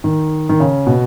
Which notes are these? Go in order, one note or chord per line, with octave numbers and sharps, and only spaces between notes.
D#3
D#3
C#3
B2